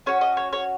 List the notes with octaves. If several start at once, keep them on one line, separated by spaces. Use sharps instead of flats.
C#4 F#4 C#5
D#5
C#5
C#5